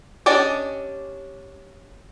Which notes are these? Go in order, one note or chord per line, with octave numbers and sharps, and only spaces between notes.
C#4 D4 G4 D5 D#5